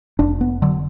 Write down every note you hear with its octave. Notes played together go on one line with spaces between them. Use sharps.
F1 D4
B3
D3 F#3